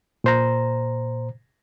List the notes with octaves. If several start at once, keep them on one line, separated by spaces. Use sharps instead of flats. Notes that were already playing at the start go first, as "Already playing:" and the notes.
A#2 C5 A#5